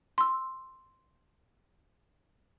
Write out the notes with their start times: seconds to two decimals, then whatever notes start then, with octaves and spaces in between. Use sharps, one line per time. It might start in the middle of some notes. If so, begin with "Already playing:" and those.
0.18 C6 E6